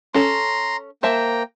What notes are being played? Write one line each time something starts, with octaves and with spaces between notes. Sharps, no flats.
C#4 A4 A#5 C6
A#3 C5 E5 G5 A5 A#5